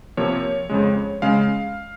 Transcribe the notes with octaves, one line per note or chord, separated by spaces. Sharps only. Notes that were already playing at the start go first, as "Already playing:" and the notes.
C3 F3 A#3 C#5
F2 C#3 G#3
C#3 G#3 F5